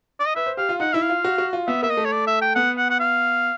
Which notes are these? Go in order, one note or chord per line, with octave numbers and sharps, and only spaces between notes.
D5
D#5
B4 E5
C5
G4 F5
F4
D#4 F#5
E4 E5
F5
F4
F#4
F#4
F4
B3 E5
A#3 E5
D#5
A3
C#5
D5
E5
G5
B3 F#5
F#5
F#5
F5